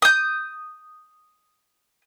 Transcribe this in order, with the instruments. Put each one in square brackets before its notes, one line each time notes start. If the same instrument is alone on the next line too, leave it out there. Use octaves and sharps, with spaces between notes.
[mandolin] D#6 G6